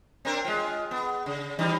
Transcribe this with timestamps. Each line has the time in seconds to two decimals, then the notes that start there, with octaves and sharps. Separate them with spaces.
0.25 C4 D4 A#4
0.45 G#3 F4
0.91 B3
1.26 C#3
1.59 E3 G3 D#4